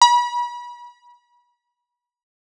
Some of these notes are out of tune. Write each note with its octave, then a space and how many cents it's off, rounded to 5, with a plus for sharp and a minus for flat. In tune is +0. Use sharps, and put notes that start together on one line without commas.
B5 -35